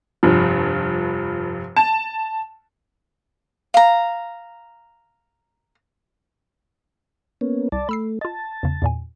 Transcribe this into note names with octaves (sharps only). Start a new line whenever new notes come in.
F1 G2 F3
A5
F5 A#5
A#3 B3 C#4
C2 D5 A5
A3 B5 E6 C7
F4 D#5 A5
E2 C#3
E2 A#2 G#5